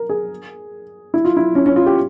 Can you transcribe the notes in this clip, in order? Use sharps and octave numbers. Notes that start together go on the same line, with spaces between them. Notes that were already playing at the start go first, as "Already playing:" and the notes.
Already playing: A#4
G#4
E4
F4
E4
C#4
C#4
F4
G4